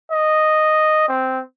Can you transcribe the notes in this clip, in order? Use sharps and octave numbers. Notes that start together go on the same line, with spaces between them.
D#5
C4